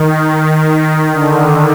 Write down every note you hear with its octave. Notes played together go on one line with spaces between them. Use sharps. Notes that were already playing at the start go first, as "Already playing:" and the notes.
Already playing: D#3
D#3
D3